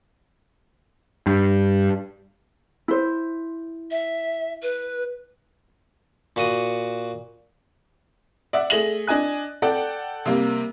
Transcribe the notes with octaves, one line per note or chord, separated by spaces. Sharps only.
G2
E4 C5
E5
B4
A#2 F#4 D#6
D5 E5 F#5
A3 G#4 A#6 F#7
D4 D#5 G#5 F#6
A4 D5 F#5 G5
C3 G3 A#3